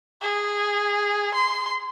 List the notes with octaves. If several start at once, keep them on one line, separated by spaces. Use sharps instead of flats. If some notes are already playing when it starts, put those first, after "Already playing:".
G#4
C6